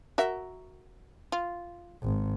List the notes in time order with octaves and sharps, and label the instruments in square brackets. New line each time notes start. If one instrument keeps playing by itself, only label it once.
[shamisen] F#4 A#4 E5
F4
[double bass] G#1